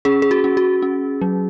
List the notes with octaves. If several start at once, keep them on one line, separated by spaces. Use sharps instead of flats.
C#4 G#4
G#4
F#4
C#4
F#4
C#4
F#3